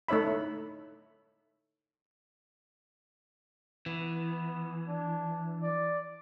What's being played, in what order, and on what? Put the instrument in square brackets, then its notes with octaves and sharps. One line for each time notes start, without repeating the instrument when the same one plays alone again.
[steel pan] A3 D#4 C#5 E5 B5
[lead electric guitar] E3 [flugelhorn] B3
[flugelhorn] D4
D5